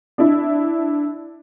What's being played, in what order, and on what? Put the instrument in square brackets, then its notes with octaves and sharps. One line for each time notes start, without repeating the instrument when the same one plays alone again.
[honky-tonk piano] D4 E4